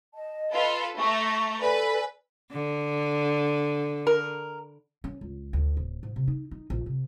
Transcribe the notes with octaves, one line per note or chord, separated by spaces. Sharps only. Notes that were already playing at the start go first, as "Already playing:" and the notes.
D#5 A5
F4 A4 B4
A3 A#5 C#6
A4 B4 D5 G#5
D3
A#4
C#4
C#2
D2
D1
G#2
C3
D#4
D#4
A#1
C3